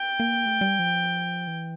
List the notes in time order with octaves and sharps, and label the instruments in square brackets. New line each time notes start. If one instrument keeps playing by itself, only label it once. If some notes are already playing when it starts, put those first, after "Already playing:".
Already playing: [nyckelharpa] G5
[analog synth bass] A#3
A3
G3
F3
E3